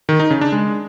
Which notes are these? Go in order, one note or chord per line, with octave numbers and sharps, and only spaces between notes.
D#3
D#4
C#3
D4
G#3